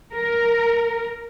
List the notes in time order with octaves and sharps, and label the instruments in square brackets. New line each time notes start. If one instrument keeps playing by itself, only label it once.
[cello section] A#4